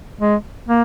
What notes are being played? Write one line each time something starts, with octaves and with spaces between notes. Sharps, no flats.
G#3
A#3